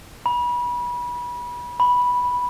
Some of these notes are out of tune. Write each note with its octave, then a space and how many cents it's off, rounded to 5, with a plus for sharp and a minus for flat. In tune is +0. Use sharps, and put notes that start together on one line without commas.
B5 -30
B5 -10